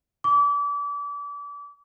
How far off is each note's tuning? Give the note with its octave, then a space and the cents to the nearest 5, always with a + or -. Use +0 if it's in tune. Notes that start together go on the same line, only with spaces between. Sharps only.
D6 -35